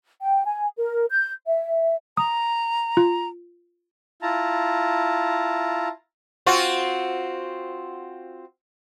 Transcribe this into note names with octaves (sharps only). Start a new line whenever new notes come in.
G5
G#5
A#4
G6
E5
A#5 D#6
F4
E4 F4 A5 A#5
C4 F4 F#4